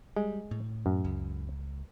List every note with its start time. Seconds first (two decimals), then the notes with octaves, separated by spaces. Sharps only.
0.16 G3 G#3
0.51 A2
0.86 F#2
1.05 C#2